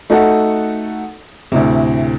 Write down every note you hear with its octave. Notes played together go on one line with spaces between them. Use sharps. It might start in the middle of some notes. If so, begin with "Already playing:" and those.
A3 D#4 F#4 A4 F#5
D2 A2 C3